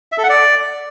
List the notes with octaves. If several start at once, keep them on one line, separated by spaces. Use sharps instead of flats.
E5
A4
F#5
D5